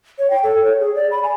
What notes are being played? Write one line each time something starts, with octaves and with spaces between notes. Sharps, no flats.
C#5
G5
A4
C#5
G#4
D5
B5
G#5